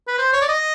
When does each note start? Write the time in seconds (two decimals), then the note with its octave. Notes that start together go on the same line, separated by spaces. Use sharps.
0.08 B4
0.18 C5
0.33 C#5
0.41 D5
0.48 D#5